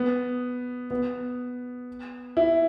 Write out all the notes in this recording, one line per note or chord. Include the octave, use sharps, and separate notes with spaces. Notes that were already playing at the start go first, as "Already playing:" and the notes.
Already playing: B3
B3
E4